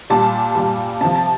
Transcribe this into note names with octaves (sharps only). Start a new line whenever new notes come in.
A#2 G3 A5
A#2 G3
C3 F3 A5
A5